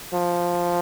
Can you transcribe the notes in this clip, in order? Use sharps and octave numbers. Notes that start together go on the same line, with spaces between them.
F3